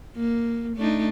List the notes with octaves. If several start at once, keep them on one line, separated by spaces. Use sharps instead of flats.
A#3
A3 D4 D#4